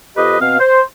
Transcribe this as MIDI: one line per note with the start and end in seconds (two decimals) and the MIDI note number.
0.17 0.39 41
0.17 0.39 67
0.17 0.39 71
0.17 0.39 75
0.40 0.57 47
0.40 0.57 60
0.40 0.57 77
0.59 0.81 72